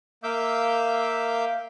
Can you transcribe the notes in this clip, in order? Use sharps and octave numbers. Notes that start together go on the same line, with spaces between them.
A#3 E5 F5 D6 E6 G6